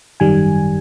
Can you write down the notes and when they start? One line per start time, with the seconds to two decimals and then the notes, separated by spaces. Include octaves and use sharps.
0.20 G#1 F#2 D#3 G3 G#5